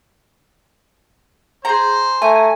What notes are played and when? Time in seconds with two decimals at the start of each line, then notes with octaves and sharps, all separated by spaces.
1.65 G#4 C5 A#5
2.22 A3 G#5 A#5